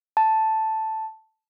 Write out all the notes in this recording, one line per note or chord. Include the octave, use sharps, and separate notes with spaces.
A5